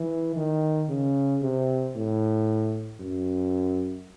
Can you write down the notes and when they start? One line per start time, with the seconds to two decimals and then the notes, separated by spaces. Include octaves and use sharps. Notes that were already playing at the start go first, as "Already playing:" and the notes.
Already playing: E3
0.36 D#3
0.90 C#3
1.42 C3
1.96 A2
3.01 F#2